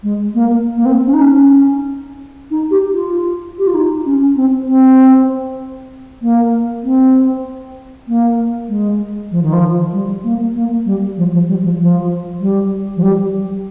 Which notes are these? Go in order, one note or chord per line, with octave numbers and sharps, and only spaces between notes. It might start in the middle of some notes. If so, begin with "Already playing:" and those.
G#3
A#3
A#3
C4
C#4
D#4
C#4
D#4
G4
F4
G4
F4
D#4
C#4
C4
C4
A#3
C4
A#3
G#3
F3
D#3
F3
G3
A#3
A#3
G3
F3
F3
G3
F3
F3
G3
F3
G3